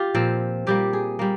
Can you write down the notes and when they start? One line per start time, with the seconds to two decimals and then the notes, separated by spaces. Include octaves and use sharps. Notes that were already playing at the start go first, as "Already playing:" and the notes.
Already playing: F4 G4
0.14 A#2 F3 C4
0.67 A#2 G3 A#3 G4
0.93 G#4
1.19 G3 A#3